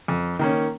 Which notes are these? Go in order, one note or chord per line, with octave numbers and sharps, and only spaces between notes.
F2
D#3 A#3 C#4